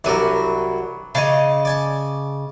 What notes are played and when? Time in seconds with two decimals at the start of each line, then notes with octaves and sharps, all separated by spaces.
0.04 C2 E3 F#3 D4 A#4
1.15 C#3 C#5 D#5 A5 D6
1.65 D5 G#5 A5